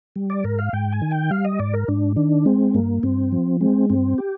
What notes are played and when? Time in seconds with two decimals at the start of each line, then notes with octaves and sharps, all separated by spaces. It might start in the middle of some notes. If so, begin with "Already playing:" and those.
0.16 G3
0.30 D5
0.44 G#2 A#4
0.59 F5
0.73 G#2 G5
0.92 G#5
1.02 D#3
1.11 G5
1.31 G3 F5
1.45 D#5
1.59 G#2 D5
1.74 A#4
1.88 G#2 D4
2.16 D#3 D4
2.46 G#3 C4
2.74 G2 A#3
3.03 G2 C4
3.32 F3
3.61 G#3 C4
3.90 G2 C4
4.18 G4